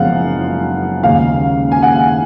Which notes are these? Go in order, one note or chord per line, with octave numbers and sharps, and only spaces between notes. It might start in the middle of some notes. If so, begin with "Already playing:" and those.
Already playing: F#1 F#2 F3 G#3 B3 F5 F#5
D#2 C#3 G#3 C#4 F5
G#5
F#5